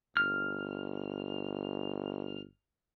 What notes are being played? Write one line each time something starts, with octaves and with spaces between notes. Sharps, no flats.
G1 F6